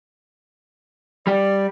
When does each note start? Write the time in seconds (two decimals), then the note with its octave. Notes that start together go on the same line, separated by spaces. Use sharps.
1.27 G3 G4 D5